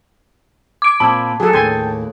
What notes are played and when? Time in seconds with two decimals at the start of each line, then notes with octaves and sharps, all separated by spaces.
0.82 D6 D7
1.00 A#2 C4 A5 B5 E6 G#6
1.40 F#3 G#4 A4
1.53 D#2 A2 G5 G#5 C6 G6 A6